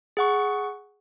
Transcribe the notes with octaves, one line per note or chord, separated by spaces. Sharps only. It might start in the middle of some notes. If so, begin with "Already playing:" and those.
G#4 F#5 C#6